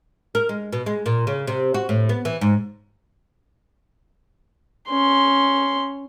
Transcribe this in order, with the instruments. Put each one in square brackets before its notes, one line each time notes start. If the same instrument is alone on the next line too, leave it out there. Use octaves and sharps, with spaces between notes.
[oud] A#4
G#3
B2
G#3
A#2
C#3
C3
F#4
A2
B3
E3
G#2
[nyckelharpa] C#4 C6